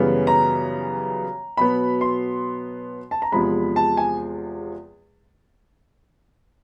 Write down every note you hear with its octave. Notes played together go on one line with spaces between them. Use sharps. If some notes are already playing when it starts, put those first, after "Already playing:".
Already playing: F#2 C#3 E3 G3 B3
A#5
B2 F#3 B3 B5
C6
A5
A#5
E2 C3 F3 G#3 B5
A5
G#5